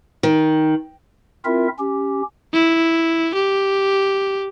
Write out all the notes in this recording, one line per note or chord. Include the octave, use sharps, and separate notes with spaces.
D#3
C4 E4 F4 A#4 E5
C#4 G4
E4
G4